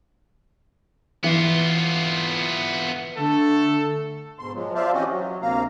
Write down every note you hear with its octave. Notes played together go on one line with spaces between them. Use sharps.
E3 B3 F4
D3 A3 A4
G#2 B2 C6
F3 F#3 G#3
F4 C5 D5 E5 F5 A5
E3 C4 C#4 F#4 G4 D#5
F#3
D2 C3 A#3 F5 A#5